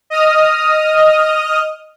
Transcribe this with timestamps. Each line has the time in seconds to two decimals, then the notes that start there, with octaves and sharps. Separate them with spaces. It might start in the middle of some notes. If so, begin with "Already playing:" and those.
0.10 D#5 D#6 F6